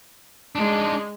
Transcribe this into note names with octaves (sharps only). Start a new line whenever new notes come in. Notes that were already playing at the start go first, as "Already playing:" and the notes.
G#3 D4 D#4